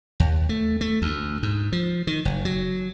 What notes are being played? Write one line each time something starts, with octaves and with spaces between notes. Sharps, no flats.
D#2
A3
A3
D2
G#2
F3
D#3
F#1
F#3